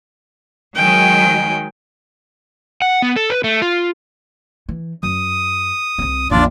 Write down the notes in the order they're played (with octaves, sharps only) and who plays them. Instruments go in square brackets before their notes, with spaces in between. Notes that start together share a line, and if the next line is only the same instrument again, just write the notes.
[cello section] D#3 F#3 G#3 [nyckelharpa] G5 G#5
[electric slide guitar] F#5
B3
A4
B4
A3
F4
[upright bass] E3
[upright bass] F#2 [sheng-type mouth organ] D#6
[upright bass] C2 C4
[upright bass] A#1 F2 [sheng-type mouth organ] D4 F4 D5